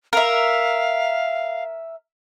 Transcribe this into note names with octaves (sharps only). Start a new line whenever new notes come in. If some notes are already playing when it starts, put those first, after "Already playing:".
A#4 E5 F5